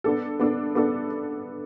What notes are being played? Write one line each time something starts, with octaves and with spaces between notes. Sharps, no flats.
B3 D4 A4
B3 D4 A4
B3 D4 A4